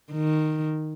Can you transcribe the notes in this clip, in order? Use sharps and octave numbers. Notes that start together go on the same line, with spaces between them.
D#3